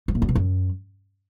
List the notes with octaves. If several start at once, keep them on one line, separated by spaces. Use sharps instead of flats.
G#2
A#2
F#2
B2
F#2